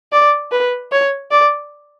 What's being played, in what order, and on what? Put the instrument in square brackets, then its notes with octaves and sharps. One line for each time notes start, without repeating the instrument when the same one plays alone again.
[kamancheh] D5
B4
C#5
D5